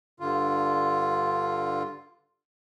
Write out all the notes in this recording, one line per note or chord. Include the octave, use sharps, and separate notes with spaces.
G2 D3 F4